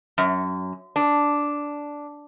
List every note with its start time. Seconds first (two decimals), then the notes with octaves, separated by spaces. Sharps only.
0.18 F#2
0.96 D4